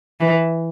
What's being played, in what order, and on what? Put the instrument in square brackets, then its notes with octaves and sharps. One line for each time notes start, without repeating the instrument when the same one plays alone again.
[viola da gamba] E3